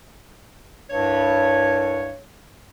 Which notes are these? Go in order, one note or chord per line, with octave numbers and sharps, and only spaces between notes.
C2 G2 C#5